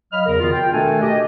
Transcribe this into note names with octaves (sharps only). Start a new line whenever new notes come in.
F#3 D#5 F5 B5 F6
E2 C#3 A#4
B2 D#3 B3 F4
G5
B2 D#3 A3 D4 A4 G#5
G4 D#5